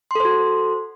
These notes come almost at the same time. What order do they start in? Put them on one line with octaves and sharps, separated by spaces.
C6 A4 C5 F#4